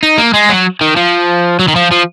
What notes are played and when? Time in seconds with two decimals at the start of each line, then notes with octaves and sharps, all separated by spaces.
0.03 D#4
0.18 A#3
0.34 G#3
0.49 F#3
0.81 D#3
0.97 F3
1.59 F#3
1.68 D#3
1.76 F3
1.91 F3